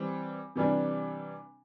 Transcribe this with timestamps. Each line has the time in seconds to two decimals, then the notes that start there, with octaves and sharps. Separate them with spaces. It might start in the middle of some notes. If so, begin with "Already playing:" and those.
Already playing: E3 G3 C4
0.56 C3 E3 G3 D4